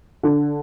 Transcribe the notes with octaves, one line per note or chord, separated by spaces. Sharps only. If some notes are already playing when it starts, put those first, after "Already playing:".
D3